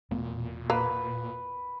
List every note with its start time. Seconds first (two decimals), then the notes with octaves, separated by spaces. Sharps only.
0.11 E1 A#2 A3 B3
0.70 A#3 B4